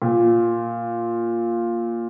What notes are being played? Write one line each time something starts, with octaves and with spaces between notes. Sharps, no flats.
A#2